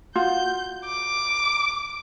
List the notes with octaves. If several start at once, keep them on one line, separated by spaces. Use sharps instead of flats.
F4 F#4 G6
D6